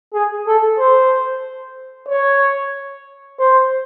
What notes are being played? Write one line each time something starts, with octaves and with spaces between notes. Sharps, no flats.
G#4
A4
C5
C#5
C5